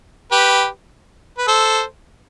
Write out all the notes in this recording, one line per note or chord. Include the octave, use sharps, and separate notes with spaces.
G4 B4
B4
A4 C5